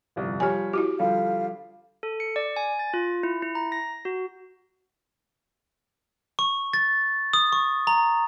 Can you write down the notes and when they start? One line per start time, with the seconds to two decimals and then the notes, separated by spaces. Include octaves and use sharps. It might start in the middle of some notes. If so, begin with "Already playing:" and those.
0.16 G1 C2 F2
0.40 F3 G3 G4 C#5 G#5
0.73 E4 F#4 G4 D6
0.99 D3 F3 G3 F5
2.03 A4
2.20 C#7
2.36 D5
2.56 G#5
2.79 A6
2.94 F4
3.23 E4
3.42 E4
3.55 A#5
3.72 A#6
4.05 F#4
6.39 C#6
6.73 A6
7.33 D#6
7.52 C#6
7.87 A#5